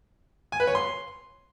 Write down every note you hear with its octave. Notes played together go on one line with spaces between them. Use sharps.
G#5
B4
C#5
C6